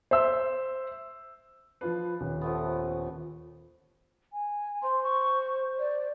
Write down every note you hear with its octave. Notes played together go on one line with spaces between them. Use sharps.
C5 E5 E6
F3 D4 F4 B4
D#1
F3 A3 B3
G#5
C5 C6
C#6
D5